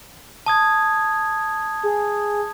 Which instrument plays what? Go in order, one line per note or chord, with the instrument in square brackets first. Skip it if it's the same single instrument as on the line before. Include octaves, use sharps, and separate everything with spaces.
[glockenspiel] A5 D#6 G#6
[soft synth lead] G#4